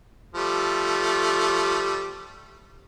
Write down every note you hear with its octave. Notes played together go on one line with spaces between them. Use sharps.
F3 G3 A3